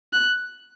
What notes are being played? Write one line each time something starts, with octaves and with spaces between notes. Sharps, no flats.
F#6